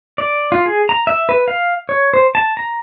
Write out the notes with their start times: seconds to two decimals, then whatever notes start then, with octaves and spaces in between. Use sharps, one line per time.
0.18 D5
0.52 F4
0.66 G#4
0.89 A#5
1.07 E5
1.29 B4
1.48 F5
1.89 C#5
2.14 C5
2.35 A5
2.57 A#5